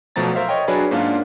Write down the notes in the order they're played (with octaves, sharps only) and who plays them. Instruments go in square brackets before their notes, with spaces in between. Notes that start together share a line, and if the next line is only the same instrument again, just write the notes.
[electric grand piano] B1 B2 F3 A3 A#5 A6
A#4 C5 E5 F5
C#5 D#5 G5
F#3 D4 G#4 A#4 B4 D5
G#2 A#3 C#4 D4 F4